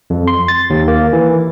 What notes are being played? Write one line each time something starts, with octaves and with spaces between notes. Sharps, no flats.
F2
C6
A6
D#2
A#3
E3